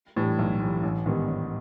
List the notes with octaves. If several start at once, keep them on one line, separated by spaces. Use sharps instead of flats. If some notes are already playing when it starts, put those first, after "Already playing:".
A2 E3 G3
B1
A2 E3 G3
A1
G#2 D#3 G3 B3
A1